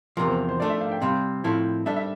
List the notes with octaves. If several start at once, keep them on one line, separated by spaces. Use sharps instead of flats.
E2 C3 F3 A#4
C5
C5
F3 A3 D4 D5
E5
F5
G5
C3 G3 C4 F5
A2 F3 C4 E4 A4
G3 D4 A4 E5
E5